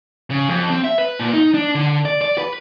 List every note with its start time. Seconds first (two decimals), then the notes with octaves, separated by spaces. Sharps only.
0.31 C#3
0.49 F2
0.70 C4
0.84 E5
0.98 B4
1.19 A#2
1.33 D#4
1.54 D4
1.75 D3
2.05 D5
2.22 D5
2.38 B4